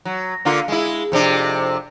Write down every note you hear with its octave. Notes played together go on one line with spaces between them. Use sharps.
F#3
D3 A#3 F4
G#3 E4
F2 C3 D4